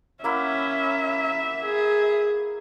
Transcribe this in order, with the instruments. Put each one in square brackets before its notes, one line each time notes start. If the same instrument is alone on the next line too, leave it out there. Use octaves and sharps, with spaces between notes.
[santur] A#3 E4 F#5 [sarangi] C#4 [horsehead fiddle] E5
[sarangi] G#4